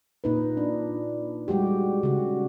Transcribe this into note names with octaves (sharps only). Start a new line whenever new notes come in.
A#2 D#4 B4
D4
G3 G#3 F#4 G4
C#3 F#4